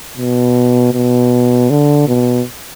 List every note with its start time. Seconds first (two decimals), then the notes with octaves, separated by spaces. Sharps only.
0.17 B2
0.93 B2
1.70 D3
2.07 B2